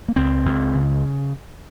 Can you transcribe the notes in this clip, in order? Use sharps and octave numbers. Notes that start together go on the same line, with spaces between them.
A#3
C#2 C4
C#2
C#3